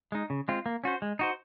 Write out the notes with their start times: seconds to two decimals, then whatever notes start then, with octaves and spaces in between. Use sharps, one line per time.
0.12 G#3 D#4
0.30 C#3
0.48 G#3 C4 F4
0.66 A#3
0.84 C#4 F#4 C5
1.02 G#3
1.19 D#4 F#4 C5